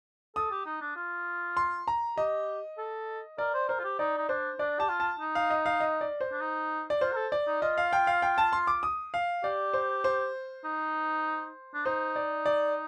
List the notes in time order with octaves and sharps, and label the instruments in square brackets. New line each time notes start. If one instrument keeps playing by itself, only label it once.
[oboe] A4 [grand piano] D#6
[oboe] G4
D#4
D4
F4
[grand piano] C6
A#5
[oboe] G4 [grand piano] D#5
[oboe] A4
[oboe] A#4 [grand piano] D5
[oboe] C5
[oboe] A#4 [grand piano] C5
[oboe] F4
G4
[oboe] D#4 [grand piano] D5
[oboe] D#4
[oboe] D4 [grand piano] C5
[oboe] D4 [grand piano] D5
[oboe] G4 [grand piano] A5
[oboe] F4
[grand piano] A5
[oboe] D#4
[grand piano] F5
D#5
F5
D#5
D5
C5
[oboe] D4
D#4
[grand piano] D5
[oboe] F4 [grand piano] C5
[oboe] A#4
A4
[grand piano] D5
[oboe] D#4
[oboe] F4 [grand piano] D#5
[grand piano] F5
G5
F5
G5
A5
C6
D6
D#6
F5
[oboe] G4 [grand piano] D5
[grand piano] C5
C5
[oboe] D#4
D4
[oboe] D#4 [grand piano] C5
[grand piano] D5
D5